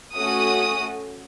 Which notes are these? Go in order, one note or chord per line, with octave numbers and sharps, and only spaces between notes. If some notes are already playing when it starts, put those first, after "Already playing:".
A3 C#4 F#4 D#6